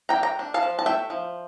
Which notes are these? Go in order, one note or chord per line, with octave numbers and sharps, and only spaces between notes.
G5 A#5
D4
G5 A#5
D4
F5 A5
F3
A5
A3 E5 G5
F3